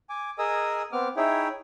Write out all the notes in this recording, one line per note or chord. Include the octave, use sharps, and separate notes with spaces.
G#5 D6
G#4 A#4 D#5 G#5 D#6 E6
B3 C4 D6 F6
D#4 E4 G#4 C#5 E5 G5